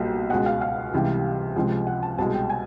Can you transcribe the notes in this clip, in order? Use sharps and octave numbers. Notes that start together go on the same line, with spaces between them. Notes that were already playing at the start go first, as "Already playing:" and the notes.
Already playing: B1 A#2 G3 G5
C#2 B2 G#3 F#5
F5
F5
C#2 C3 E3 G3
C#2 C3 F3 G#3
F#5
A5
C2 B2 G#3 A5
G5
G#5